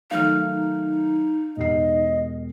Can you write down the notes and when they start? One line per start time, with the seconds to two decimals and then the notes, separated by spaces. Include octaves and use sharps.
0.11 D#3 F#3 A3 D#4 F5 F6
1.57 E1 G4 D#5 C7